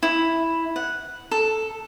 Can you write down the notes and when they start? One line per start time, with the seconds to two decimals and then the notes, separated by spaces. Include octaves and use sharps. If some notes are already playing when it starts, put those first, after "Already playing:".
0.03 E4
0.76 F#5
1.31 A4